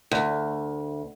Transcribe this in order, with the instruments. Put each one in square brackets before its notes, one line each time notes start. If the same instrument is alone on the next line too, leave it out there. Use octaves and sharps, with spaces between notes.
[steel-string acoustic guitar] D2